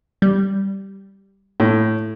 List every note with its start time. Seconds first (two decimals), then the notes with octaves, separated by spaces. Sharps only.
0.22 G3
1.60 A2